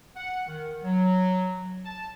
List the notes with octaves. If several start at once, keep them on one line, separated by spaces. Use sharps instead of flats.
F#5
D#3
F#3
A5